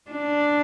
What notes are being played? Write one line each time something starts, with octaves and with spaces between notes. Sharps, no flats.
D4